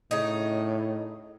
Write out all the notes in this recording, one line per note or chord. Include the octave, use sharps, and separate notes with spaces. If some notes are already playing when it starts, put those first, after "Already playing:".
A2 C#3 D#4